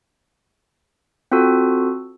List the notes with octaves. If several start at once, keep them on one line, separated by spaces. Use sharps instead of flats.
C4 F4 F#4 A4